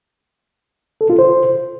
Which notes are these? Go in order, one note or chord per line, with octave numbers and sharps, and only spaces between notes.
A4
F4
C5